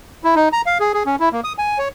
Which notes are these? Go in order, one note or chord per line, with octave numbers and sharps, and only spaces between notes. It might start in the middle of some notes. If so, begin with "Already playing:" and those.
E4
D#4
A#5
F5
G#4
G#4
C#4
E4
A#3
D#6
G#5
C#5